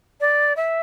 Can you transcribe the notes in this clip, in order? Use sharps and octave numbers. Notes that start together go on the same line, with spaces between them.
D5
E5